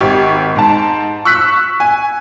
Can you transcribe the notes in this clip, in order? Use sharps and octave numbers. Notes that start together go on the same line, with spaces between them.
G#1 G4 C#6
G#2 A5
C#6 E6 F#6 B6
G#5